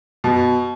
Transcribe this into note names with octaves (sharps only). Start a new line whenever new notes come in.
B2